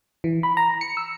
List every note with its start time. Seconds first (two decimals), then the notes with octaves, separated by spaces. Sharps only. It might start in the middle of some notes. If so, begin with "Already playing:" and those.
0.24 E3
0.43 B5
0.57 A#5
0.81 C#7
0.97 E6